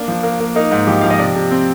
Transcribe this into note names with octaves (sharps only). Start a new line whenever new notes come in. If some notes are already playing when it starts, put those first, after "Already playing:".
Already playing: A#3 D4
F3
A#3
A#3
A#3 D#4
G#2
F3 G4
F3 F5
D#5
C3 D5
C3
C4